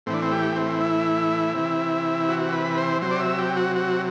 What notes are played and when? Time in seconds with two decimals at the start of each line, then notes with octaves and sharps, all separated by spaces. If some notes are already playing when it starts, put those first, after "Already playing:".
0.06 A2 C4
0.10 E3 D4
0.22 C4
0.32 G4
0.56 C4
0.80 E4
1.54 C3 E3
2.29 F#4
2.52 B4
2.77 C5
3.02 C3 F#3 C5
3.11 D5
3.20 E5
3.38 G4
3.56 F#4
3.76 F#4